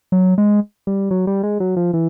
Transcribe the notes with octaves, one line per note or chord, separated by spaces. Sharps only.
F#3
G#3
G3
F#3
G3
G#3
F#3
F3
E3